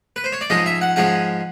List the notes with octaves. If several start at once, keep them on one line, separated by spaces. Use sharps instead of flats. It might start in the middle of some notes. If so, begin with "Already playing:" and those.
B4
C5
C#5
D5
G#2 F3 G#3 C#4 D#5
E5
F#5
G#2 F3 G#3 C#4 F#5